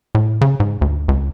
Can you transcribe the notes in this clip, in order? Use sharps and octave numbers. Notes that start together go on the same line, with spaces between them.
A2
C#3
G#2
D2
C#2